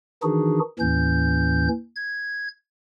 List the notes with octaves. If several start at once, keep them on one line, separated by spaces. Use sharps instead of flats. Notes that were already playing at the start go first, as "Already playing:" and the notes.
D#3 E3 D4 D#4 F#4 G#4
D#2 A2 E3 C#4 G6
G#6